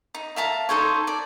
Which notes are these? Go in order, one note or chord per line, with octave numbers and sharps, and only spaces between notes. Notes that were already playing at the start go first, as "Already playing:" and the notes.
D#4
E5 F5 A5 A#5
D#4 A4 C5 C#5
D5